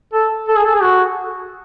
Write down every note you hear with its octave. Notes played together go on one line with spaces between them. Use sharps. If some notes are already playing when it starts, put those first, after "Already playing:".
A4
A4
G#4
A4
G#4
F#4